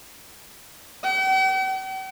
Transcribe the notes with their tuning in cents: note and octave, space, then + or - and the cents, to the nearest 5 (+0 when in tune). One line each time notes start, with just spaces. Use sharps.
G5 -45